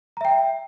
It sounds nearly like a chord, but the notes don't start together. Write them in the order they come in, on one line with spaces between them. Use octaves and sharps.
A#5 E5 G5